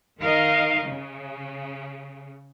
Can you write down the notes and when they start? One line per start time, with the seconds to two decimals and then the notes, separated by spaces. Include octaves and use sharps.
0.19 D#3 A#4 D#5 F5
0.84 C#3